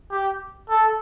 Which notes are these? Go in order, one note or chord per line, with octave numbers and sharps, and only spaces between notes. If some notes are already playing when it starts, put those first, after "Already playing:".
G4
A4